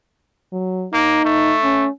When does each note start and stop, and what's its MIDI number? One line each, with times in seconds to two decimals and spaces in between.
0.53 0.86 54
0.93 1.21 58
0.93 1.55 63
1.25 1.86 57
1.64 1.89 61